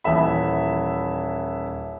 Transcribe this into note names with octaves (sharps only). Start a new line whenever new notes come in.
D#1 E3 E5 B5